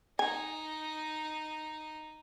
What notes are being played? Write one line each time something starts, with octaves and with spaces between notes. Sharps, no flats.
D#4 G#5